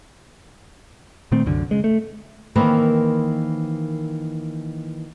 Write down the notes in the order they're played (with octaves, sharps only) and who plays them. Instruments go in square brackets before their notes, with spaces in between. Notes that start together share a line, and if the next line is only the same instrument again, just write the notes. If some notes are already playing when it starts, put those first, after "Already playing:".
[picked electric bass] A#2 D#3 A3 C4
C2 F#2 D3
C#3 G#3
A3
[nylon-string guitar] D#3 E3 A#3 C4 A#4 B4